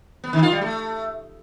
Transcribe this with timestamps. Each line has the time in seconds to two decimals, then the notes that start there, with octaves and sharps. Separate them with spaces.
0.24 B3
0.33 D#3
0.42 F4
0.52 G3
0.61 A3